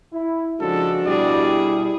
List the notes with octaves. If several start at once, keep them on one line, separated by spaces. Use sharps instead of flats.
E4
C#3 F3 G#3 D4 F#4 A4
B2 G3 E4 G#4 D5